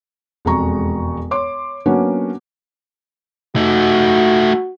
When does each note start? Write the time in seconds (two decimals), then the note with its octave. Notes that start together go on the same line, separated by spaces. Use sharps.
0.45 E1 F2 G#3 A#5 C#6
1.31 C#5 C6 D6
1.86 F#3 A#3 B3 C#4 D4 F#4
3.56 A3 D#4 F#4